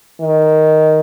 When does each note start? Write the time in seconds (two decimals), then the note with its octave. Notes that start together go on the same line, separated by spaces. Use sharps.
0.21 D#3